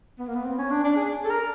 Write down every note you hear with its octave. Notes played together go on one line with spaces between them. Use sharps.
B3
A#3
B3
C4
C#4
D4
D4
G#4
A4
A#4